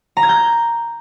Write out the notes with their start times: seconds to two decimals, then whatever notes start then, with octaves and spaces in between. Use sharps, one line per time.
0.17 A#5
0.23 G#6
0.29 G6